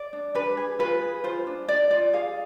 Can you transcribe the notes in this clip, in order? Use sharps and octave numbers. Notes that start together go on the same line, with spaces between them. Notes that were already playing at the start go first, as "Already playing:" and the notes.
Already playing: D5
D4
D4 B4
G#4
F4 B4
G#4
F4 C5
D4
D4 D5
F4 D5
G#4 F5